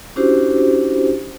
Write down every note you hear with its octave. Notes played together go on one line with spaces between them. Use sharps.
C#4 D4 E4 F#4 G4 C5